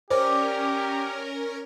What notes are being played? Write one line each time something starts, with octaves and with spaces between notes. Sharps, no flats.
C#4 G4 A#4 C5 D5